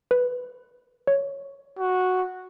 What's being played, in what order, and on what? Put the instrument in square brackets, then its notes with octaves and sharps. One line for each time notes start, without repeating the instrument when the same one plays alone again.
[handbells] B4
C#5
[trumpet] F#4